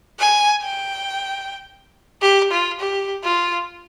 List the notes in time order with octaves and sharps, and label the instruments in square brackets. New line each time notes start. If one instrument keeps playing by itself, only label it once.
[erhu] G#5
G5
G4
F4
G4
F4